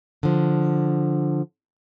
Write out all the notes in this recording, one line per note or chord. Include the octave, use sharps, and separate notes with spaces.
D3 F3